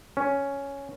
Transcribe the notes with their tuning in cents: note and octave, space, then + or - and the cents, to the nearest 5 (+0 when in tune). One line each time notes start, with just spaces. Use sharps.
C#4 +5